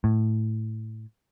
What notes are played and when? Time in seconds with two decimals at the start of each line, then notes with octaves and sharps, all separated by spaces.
0.04 A2